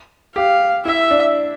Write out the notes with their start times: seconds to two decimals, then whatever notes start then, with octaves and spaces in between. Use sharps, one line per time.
0.36 G4 F5
0.85 E4 E5
1.11 D4